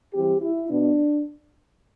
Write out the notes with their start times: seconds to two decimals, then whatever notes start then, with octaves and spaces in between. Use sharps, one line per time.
0.13 E3 G3 C4 G4
0.41 E4
0.70 B2 B3 D4